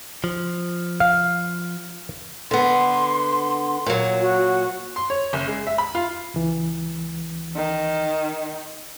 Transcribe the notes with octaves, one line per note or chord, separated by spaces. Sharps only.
F3
F5
D3 B3 C6
A#2 F#3
F#4
C6
C#5
F#1
G#3
E5
B5
F4
C#2 E3
D#3